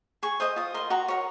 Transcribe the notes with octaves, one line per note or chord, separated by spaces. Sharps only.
G#4 C#6
C5 D#5 D#6
F4 D#6
A#4 D#5 C6
F#4 A#5
A#4 C#5